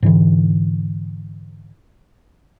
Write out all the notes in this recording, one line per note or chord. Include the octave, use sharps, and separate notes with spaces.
G#2 D3 E3